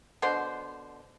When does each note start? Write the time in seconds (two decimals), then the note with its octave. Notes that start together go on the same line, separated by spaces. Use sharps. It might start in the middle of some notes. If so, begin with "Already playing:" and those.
0.22 B2 D3 C5